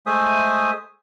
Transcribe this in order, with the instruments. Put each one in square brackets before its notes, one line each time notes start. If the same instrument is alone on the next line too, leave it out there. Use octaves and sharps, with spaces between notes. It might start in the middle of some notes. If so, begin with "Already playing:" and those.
[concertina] G#3 A3 C5 E5 G#5 D#6